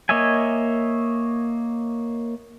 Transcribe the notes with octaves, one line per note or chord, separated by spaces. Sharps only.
A#3 C#5 D#5 E5 G#5